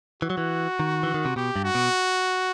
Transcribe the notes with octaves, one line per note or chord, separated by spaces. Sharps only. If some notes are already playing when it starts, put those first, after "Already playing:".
E3 F#4
F#3
E3
D#3
E3
D#3
C3
B2 G4
G2
F#4
B2